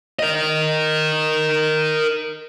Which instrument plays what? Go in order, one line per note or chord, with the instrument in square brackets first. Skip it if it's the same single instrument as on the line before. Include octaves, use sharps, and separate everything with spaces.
[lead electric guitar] A#4 D#5